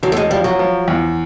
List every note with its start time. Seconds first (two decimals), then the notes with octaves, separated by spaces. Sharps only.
0.03 E1 F#3
0.12 A3
0.17 G#3
0.30 F3 G3
0.44 F#3
0.59 F3
0.88 E2